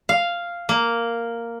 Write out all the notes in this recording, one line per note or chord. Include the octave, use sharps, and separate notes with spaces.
F5
A#3